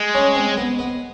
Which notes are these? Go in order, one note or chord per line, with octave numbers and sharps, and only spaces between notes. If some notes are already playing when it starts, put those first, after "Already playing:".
Already playing: G#3
C#4
C4
B3
B3